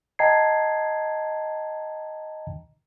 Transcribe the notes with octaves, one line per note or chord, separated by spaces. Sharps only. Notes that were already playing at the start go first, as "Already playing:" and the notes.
D#5 G5 A5 A#5 G#6 C7